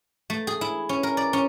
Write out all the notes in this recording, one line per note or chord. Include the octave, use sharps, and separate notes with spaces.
A3
G#4
E4
C#4
A#4
D5
C#4